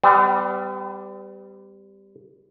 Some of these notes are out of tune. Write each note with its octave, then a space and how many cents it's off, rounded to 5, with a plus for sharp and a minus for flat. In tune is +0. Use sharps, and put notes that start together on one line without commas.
G3 +0 B3 +45